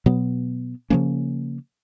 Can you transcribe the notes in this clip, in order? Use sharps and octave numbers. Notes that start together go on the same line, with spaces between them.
B2 F#3 B3
C#3 F3 A#3 C#4